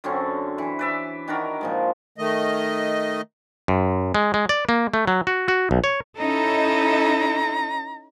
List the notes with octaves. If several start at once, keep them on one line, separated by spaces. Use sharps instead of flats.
F#2 D3 C4 C#4
E3
B4 D5 E5
D#3 D4 F#4 A#4
A#2 F3 G#3
D#3 A3 D#5
F#2
G#3
G#3
D5
A#3
A3
F#3
F#4
F#4
B1
C#5
C#4 D#4 E4 A4 A#5